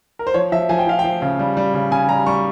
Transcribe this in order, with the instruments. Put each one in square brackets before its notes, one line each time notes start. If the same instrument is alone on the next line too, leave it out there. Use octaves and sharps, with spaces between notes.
[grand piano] A#4
C5
F3 C#5
F3 E5
F3 G#5
G5
F3 F5
G5
F3
C#3
G3
G3
C#3
C#3 G#5
G3 A#5
G3 C#6